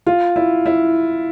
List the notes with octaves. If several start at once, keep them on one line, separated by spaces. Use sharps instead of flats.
F4
E4
E4